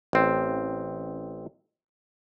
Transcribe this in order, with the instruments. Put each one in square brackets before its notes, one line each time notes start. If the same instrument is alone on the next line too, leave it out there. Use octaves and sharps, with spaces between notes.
[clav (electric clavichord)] A1 C4